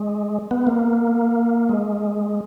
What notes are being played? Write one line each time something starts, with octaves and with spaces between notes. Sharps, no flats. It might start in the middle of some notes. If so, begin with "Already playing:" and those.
Already playing: G#3
B3
A#3
G#3